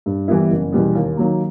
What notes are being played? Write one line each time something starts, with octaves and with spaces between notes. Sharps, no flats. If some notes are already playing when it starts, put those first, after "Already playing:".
G2
E3 G3 B3 E4
F#1
E2 B2 G3 B3
D#2
D#3 F#3 A#3